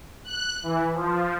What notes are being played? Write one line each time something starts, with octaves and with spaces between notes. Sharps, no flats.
F#6
E3
F3